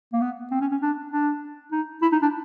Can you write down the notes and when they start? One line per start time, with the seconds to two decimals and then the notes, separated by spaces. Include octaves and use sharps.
0.13 A#3
0.21 B3
0.51 C4
0.61 C#4
0.71 C#4
0.82 D4
1.12 D4
1.72 D#4
2.02 E4
2.12 D#4
2.22 D4